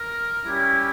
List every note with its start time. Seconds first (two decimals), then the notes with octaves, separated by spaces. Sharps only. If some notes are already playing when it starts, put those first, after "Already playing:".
Already playing: A#4
0.45 G3 C#4 E4 G4